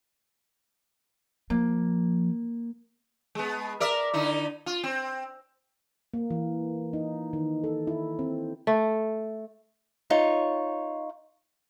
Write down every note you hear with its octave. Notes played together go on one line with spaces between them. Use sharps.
F3 A#3
G#3 B3
A#4 D5 E5
D3 D#4 E4
F4
C4
A#3
E3
D#4
D#3
A4
E4
C4
A3
D#4 F4 C#5